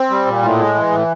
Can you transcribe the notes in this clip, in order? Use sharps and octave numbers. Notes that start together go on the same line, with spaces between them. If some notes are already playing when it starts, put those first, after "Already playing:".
Already playing: C4
G3
A#2
A2
G#3
E3
A2